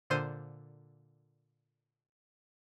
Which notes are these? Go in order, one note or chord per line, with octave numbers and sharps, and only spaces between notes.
A#2 D3 C5 D#7